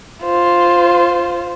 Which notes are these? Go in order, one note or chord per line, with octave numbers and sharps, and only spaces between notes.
F4 C5